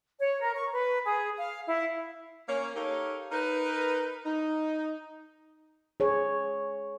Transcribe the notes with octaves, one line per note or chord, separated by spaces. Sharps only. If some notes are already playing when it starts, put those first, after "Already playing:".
C#5
A#4
C#6
B4
G#4
F5
E4
A#3 C#4 C#5
D#4 G4 A4 A#4 C#5 F5
D#4 A#4 B4
D#4
G#4 C#5